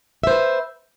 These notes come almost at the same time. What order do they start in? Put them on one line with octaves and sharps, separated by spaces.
E5 C5 B4